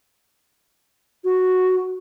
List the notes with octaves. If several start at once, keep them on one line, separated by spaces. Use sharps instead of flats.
F#4